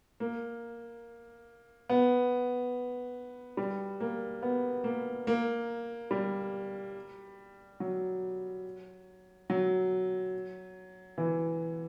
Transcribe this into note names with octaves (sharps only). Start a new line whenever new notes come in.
A#3
B3
G3
A#3
B3
A#3
A#3
G3
F#3
F#3
E3